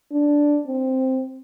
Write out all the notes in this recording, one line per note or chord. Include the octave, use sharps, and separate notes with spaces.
D4
C4